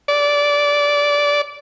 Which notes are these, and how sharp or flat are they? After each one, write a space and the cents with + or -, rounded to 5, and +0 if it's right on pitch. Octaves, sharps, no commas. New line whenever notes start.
D5 -15